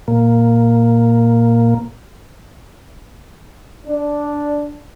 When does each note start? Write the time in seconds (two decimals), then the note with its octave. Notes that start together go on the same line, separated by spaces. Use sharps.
0.08 A#2 A#3
3.86 D4